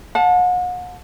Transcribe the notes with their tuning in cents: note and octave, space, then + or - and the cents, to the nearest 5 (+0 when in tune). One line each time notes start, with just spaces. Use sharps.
F#5 -40 A5 -10